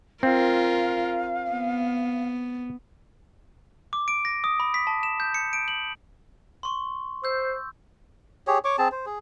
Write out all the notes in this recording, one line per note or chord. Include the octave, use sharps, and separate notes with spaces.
C4 F4 A#4 F5
B3
D6
D7
A#6
D#6
B5
B6
A5
E7
G6
C#7
D7
F#7
C6 C#6
C5 E6 G6
G4 G#4 C#5
C#5 C#6 D6
C4 G#4 A5
C5
G#4